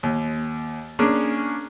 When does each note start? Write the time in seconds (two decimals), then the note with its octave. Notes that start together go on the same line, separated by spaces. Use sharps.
0.03 D#2
0.99 A#3 C#4 D4 G#4